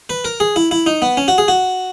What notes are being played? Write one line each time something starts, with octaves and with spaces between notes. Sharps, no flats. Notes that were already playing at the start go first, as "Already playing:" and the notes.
B4
A#4
G#4
E4
E4
D#4
B3
C#4
F#4
G#4
F#4